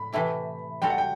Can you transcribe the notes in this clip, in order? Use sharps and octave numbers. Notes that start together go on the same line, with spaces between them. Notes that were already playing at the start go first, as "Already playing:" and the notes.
Already playing: A2 B5
C3 E3 A3 E4 G4
G3 C4 F#4 A4 G5
F#5
G5